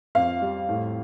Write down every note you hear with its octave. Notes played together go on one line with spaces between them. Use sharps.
F2 F5
G3
A2